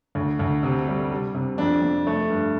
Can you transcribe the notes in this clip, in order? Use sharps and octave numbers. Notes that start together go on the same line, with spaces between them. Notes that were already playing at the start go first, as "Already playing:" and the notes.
D2
D2
C3
G3
G3
C3
F2 D4
F2
A3
G2